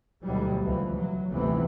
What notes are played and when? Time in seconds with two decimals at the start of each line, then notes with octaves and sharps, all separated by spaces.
0.24 D2 G#2 B2 E3 F#3 G3
0.63 C#2 E3 F3
0.94 F#3
1.31 F1 D2 C3 E3 B3